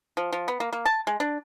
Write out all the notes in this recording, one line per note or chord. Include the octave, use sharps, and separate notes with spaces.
F3
F3
B3
A#3
A#3
A5
G#3
D4